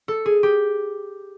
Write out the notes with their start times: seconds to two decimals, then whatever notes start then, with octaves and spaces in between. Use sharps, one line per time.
0.08 A4
0.26 G#4
0.43 G4